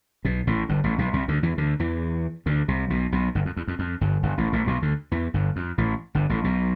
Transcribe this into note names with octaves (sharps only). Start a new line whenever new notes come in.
B1 B2
A1 A2
G1 G2
A1 A2
B1 B2
C2 C3
D2 D3
E2 E3
D2 D3
E2 E3
D2 D3
C2 C3
B1 B2
B1 B2
G1 G2
F2
E2
F2
F2
G1 G2
G1 G2
A1 A2
A1 A2
B1 B2
D2 D3
E2 E3
G1 G2
F2
A1 A2
G1 G2
A1 A2
B1 B2